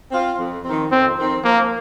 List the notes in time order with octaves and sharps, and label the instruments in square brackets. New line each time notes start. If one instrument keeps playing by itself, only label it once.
[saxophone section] C4 F4
F2
D#3 C4
[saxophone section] F2 [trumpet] C4
[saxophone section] D#3 C4
[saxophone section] F3 [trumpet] A#3